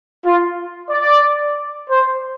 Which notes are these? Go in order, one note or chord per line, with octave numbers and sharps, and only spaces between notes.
F4
D5
C5